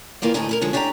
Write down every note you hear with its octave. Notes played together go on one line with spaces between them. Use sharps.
D#3 E3 A#3 F4 D5
D2 A2 D3 D#4 G#4
E4 A4 A#4
D3 F3 G#3 C#4
C#4 D4 G4 D5 F#5 A#5